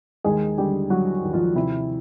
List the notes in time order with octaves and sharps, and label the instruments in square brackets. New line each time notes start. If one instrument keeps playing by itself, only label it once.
[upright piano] D#2 G#3 G#4
D3 G3 G4
F#3 G3 F#4
D#2
F3 F4
C3 E4